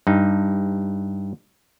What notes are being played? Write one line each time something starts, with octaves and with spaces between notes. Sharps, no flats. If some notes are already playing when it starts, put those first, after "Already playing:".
G2 D#4